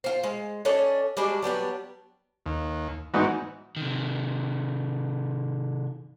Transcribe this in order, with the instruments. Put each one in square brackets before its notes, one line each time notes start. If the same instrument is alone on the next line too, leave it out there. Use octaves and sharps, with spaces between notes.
[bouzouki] F4 C5
G#3
C#4 D4 A4 D#5
G3 G#3 D4 F#4
F#3 G3 B3 D4
[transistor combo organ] D#2
[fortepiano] G#2 D#4 F#4 [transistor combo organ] E3 G#3 B3
[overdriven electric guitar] C3 D#3